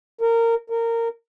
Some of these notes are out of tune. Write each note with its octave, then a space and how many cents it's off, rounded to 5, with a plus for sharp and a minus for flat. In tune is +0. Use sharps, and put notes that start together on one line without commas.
A#4 -20
A#4 -20